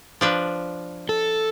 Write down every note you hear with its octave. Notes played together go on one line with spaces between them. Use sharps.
F3 D4 B4
A4